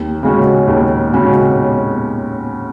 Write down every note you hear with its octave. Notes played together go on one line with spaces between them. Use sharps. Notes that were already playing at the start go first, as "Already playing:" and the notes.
Already playing: D#2
C#3 G#3 C#4 F#4
D#2
C#3 G#3 C#4 F#4